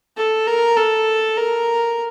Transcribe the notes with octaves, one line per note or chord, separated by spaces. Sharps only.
A4
A#4
A4
A#4